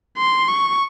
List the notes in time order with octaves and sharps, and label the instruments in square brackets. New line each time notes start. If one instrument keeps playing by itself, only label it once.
[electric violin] C6
C#6